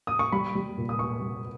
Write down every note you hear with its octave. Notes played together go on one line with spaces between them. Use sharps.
D#6
C#6
G3 B5
G3
A#2
D#6
A#2 C#6
G3